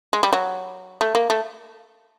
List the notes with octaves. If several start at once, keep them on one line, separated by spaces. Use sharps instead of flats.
G#3
G3
F#3
A3
A#3
A3